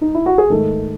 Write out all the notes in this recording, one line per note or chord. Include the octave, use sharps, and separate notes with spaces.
D#4
E4
F#4
G#4
G#2 D#3 A3 A4